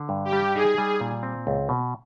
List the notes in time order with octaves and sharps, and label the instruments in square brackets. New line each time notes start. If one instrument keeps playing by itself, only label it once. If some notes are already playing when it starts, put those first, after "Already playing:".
Already playing: [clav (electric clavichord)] D3
G2
[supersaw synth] G4
[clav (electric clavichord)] G3
[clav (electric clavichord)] D#4 [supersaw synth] G#4
[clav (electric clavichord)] G3
A#2
C4
C#2
B2